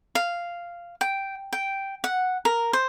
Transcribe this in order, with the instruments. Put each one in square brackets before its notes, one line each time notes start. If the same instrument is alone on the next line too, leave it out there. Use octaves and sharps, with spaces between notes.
[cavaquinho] F5
G5
G5
F#5
A#4
C5